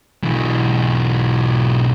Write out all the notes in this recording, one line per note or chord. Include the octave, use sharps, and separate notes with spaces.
B1 E3